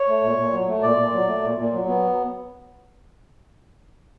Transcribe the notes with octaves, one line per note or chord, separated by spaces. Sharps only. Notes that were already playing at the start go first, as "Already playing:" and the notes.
Already playing: C#5
A3
A#2
A#2
F#3
A3
A#2 D5
A#2
F#3
A3
A#2
A#2
F#3
B3